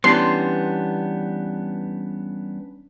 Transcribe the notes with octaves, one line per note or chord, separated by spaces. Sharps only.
E3 G3 B3 C#4 D4 B4 C6